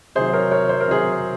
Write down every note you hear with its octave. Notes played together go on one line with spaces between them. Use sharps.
C3 D#3 F#3 G#4 C5
A#4 C#5
A#4 C#5
C5
A#4
C3 D#3 F#3 G#4 C5